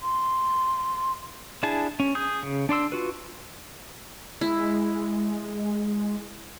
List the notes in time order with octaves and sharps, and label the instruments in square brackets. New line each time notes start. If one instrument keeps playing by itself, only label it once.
[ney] C6
[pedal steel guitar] D4 E4 G#4 A5
C#4
G#4 D#6 G6
C#3
D4 D5 C6 E6
F4 F#4 B4
[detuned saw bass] G#3 [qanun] E4